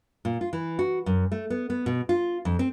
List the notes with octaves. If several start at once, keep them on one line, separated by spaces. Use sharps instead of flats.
A#2
F4
E3
F#4
F#2
A3
B3
B3
B2
F4
F2
C4